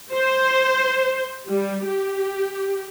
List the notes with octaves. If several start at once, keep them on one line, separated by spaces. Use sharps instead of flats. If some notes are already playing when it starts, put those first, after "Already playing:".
C5
G3
G4